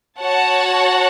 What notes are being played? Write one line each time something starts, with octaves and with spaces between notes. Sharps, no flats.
F#4 C#5 F#5 A5